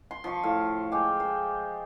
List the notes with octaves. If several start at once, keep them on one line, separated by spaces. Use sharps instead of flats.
C6
F3 C6 C#6
A2 F5
G#3 G5 D6
C5